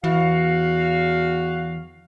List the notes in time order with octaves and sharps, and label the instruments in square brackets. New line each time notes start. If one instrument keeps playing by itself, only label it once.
[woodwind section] E2 F#4 F5 [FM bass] E3